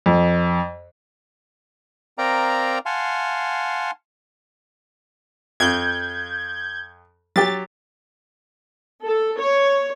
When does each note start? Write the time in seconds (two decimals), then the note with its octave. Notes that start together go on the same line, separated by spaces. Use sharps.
0.06 F2
2.18 C4 A#4 D5 F5 G5 A#5
2.86 F5 F#5 G#5 A5 C6
5.60 F2 G6 G#6
7.36 F#3 G4 A6
9.04 A4
9.39 C#5